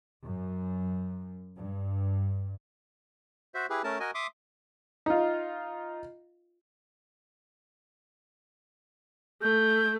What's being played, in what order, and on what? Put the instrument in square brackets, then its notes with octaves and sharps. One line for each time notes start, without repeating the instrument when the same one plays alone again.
[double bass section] F#2
G2
[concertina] F#4 C5 E5
E4 G4 G#4 B4
A3 C#4 A#4 A5
F#4 A#4 D#5 G#5
E5 C6 D6 D#6
[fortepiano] D#4 F4
[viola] A3 [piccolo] G6